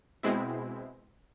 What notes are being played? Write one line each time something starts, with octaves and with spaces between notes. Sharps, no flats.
B2 G#3 C4 E4